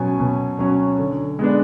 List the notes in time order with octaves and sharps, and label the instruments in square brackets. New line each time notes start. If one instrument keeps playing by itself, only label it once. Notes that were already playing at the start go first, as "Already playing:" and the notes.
Already playing: [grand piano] B2 F#3 C#4 G#5
B2
F#3 C#4
D3
G#3 B3 D4